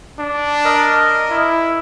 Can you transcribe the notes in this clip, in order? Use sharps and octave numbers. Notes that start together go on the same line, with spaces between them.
D4
A#4 D#5
E4